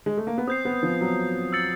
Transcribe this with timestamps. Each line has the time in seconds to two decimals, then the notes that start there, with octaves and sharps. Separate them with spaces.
0.06 G#3
0.17 A3
0.27 A#3
0.38 B3
0.47 C4 D#6 G6 C7
0.65 B3
0.83 F3
1.01 F#3
1.53 E6 A6 C#7 F#7